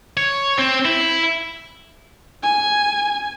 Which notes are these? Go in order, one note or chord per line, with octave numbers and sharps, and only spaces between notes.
C#5
C4
E4
G#5